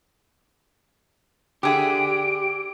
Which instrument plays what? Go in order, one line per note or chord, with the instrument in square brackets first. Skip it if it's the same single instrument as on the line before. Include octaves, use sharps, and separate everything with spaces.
[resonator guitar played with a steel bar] D3 G#4 E5 [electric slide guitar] G4 [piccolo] D7